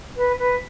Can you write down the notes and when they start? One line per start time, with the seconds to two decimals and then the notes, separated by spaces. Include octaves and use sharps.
0.16 B4
0.39 B4